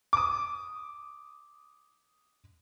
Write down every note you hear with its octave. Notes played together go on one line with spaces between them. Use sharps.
D6 D#6